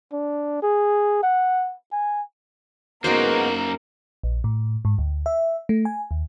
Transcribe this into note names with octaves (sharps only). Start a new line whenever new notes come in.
D4
G#4
F#5
G#5
F#2 G#3 A#3 B3 D#4 F#4 A#4 C5
A#1
A2
G#2
D2
E5
A3
G#5
D#2